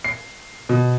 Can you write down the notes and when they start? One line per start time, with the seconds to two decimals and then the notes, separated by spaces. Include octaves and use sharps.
0.04 C7
0.69 B2